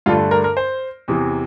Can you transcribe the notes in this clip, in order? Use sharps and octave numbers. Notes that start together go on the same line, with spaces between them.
G2 D3 A3 D4 F4
A#4
A#4
C5
E2 C3 E3